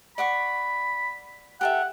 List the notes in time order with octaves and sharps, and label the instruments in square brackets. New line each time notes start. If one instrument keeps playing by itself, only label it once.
[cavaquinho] D5 F#5 C#6 [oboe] B5
[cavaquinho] G4 A4 E5 [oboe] F#5